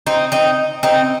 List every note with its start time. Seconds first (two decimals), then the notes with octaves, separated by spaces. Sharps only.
0.07 C4 D#4
0.32 C4 D#4
0.83 C4 D#4